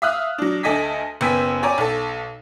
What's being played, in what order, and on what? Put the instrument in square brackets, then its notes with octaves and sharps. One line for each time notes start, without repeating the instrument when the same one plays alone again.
[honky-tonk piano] E5 F5 D#6 F6 F#6
F#3 D4
D2 A4 D#5 G#5 B6
F#1 B3 G5 G#5 E6 B6
C#5 D5 G5 G#5 A#5
B1 A4